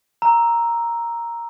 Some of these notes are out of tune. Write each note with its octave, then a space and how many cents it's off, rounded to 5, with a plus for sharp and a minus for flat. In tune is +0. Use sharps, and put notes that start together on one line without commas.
A#5 +0 E6 +0